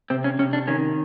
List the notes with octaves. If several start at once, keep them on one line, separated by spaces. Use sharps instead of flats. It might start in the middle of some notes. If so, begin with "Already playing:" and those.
C3 C4
C#4
C3 C#4
D4
D#3 C#4